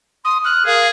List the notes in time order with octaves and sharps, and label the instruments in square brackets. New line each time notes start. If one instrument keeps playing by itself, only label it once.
[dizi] C6 [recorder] D#6
[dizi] F6 [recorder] F#6
[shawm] G#4 [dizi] A#4 [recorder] F5